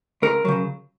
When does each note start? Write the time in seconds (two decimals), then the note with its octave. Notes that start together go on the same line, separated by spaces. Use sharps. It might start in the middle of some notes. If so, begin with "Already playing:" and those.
0.22 C#2 A#4
0.45 C#3 F#3